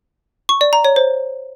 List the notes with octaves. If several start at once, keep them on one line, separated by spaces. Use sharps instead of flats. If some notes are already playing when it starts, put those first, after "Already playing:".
C#6
D5
A#5
C#5
C5